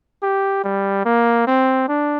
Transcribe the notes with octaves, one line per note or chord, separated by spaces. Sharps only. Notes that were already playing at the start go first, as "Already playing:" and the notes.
G4
G3
A#3
C4
D4